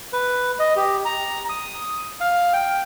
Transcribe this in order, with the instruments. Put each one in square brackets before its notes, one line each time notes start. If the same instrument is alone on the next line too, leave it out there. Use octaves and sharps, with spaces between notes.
[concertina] B4
D#5
G4
A#5
D#6
F5
G5